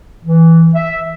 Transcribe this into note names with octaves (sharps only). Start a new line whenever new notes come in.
E3
E5